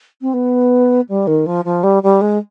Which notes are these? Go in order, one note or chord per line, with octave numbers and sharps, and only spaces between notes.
C4
B3
G3
D#3
F3
F3
G3
G3
G#3